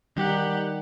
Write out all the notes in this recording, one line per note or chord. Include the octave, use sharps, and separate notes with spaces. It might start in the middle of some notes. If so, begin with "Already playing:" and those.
D#3 G3 D#4 G4 F#5